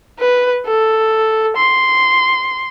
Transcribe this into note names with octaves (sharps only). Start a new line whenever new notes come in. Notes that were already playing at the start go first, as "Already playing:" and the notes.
B4
A4
C6